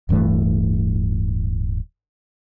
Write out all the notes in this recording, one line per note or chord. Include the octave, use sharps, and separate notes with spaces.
D1 G2 E3 A3